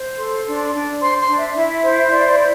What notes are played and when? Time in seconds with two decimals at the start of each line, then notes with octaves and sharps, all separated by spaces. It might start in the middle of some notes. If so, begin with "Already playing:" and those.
Already playing: C5
0.18 A4 C6
0.46 D4
0.74 D4
1.01 C5 C6
1.19 C6
1.28 D4
1.38 E5
1.56 E4 E5
1.84 C5
2.11 E4 D5
2.29 D5
2.38 C5